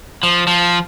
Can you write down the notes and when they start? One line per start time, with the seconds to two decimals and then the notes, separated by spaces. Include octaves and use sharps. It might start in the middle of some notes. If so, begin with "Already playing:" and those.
0.23 F3
0.47 F3